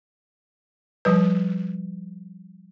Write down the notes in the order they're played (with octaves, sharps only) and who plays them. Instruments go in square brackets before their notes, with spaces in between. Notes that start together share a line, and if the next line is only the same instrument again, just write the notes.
[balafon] F3 G3 B4